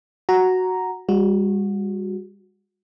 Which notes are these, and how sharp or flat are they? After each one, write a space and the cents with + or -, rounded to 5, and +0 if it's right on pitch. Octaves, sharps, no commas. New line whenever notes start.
F#4 +0 A#5 +0
G3 +40 F#4 -20